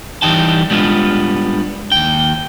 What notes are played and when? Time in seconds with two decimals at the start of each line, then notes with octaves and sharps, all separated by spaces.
0.22 E3 G3 D#4 G5 A5
0.70 G3 G#3 B3 D4 F4
1.92 D#2 G5